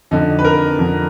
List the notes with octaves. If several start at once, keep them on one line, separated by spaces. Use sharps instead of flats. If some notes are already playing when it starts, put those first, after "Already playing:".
F2 D3 D#4
B4
A#4
F2 D3